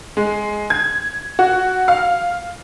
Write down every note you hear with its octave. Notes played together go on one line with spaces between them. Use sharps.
G#3
G#6
F#4
F5